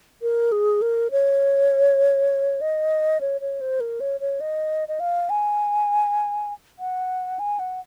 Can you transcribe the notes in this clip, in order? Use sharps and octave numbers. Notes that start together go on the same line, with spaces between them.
A#4
G#4
A#4
C#5
D#5
C#5
C#5
C5
A#4
C#5
C#5
D#5
D#5
F5
G#5
F#5
G#5
F#5